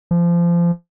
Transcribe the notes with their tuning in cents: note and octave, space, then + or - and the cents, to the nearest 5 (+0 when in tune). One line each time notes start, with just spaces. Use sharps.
F3 -25